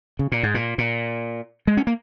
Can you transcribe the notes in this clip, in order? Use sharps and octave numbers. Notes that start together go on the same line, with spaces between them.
C#3
A#2
G#2
A#2
A#2
G#3
C#4
A#3